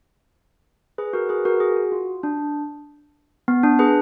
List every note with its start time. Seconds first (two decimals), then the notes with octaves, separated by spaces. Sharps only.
0.98 G#4 B4
1.13 F#4 A#4
1.29 G#4 B4
1.45 F#4 A#4
1.60 G#4
1.76 F#4
1.92 F4
2.23 D4
3.48 B3
3.63 D4
3.79 G#4 B4